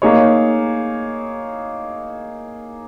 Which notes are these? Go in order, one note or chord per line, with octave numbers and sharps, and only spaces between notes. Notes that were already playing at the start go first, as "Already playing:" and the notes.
A#3 D#4 G#4 C#5